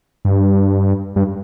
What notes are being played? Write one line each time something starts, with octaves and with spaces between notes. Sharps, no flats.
G2
G2